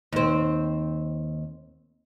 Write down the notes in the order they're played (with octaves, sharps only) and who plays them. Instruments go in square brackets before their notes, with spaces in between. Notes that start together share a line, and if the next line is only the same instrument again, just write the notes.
[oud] D#2 C4